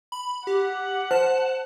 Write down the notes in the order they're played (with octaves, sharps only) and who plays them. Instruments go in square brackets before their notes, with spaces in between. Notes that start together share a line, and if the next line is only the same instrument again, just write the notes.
[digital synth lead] B5
[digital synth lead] G4 [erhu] F#5
[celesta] C5 [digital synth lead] A5